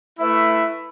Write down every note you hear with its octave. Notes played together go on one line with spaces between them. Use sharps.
A3 E4 B4 E5